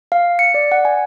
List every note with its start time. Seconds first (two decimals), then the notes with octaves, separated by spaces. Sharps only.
0.12 F5
0.39 C#7
0.54 D5
0.72 F#5
0.85 G#5